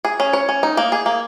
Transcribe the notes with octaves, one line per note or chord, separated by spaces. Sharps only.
G#4
C#4
C#5
C#4
D#4
A#3
G#4
A#3